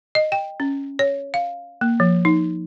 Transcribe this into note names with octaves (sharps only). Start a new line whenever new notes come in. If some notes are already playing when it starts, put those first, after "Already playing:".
D#5
G5
C#4
C#5
F5
A#3
F3
D#4